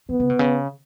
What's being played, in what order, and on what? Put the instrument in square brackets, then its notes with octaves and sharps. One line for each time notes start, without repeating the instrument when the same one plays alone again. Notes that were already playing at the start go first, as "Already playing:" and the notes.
[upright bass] D#3 [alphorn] B3
[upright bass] C#3
B2
C#3